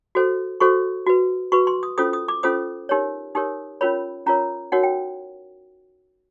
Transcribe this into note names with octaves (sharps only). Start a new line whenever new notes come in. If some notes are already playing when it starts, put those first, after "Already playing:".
F#4 A4 C5
F#4 A4 C5 C#6
F#4 B4
F#4 B4 C#6
C6
D#6
C#4 F4 A4 C5 D#6
D#6
D6
C#4 F4 A4 C5 D#6
D#4 G4 A#4 C#5
D#4 G4 A#4 C#5 D#6
C#4 F4 A#4 C#5 B5
C#4 F4 A#4 C#5 A#5
D#4 F#4 A#4 C#5 F#5
G5